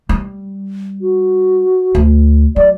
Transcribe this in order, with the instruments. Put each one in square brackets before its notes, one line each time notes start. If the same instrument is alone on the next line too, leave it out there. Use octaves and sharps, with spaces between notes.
[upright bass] G3
[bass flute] F#4
[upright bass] D2
[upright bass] F#3 [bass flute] D5